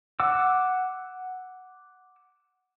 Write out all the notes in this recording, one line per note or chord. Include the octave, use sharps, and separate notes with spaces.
F#5 D6 E6